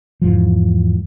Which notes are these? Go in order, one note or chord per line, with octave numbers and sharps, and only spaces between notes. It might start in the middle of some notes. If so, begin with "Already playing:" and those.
E2 G#2 F3